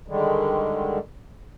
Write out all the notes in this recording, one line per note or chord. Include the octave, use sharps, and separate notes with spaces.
D3 D#3 G3 G#3